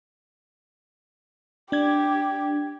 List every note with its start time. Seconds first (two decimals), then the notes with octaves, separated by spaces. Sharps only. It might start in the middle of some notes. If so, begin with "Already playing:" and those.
1.72 D4 G4 G#6